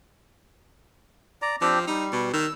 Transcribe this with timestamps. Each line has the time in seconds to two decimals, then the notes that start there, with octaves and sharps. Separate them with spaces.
1.42 D5 A#5
1.61 F3 C4 D4 G4
1.87 G3 D#4
2.12 B2
2.33 D#3 E6